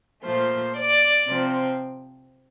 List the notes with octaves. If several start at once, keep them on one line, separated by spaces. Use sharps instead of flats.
A#2 F3 A3 C5
D5
C3 F3 C4